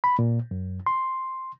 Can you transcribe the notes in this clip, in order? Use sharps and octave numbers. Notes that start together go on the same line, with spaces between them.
B5
A#2
F#2
C6